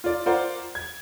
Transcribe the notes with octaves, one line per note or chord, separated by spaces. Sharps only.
F4 D5
F4 A#4 C5 D5 F#5
G#6